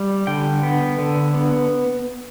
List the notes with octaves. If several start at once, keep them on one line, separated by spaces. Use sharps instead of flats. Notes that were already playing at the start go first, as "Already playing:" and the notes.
Already playing: G3
D3 G5
B3
D3
B3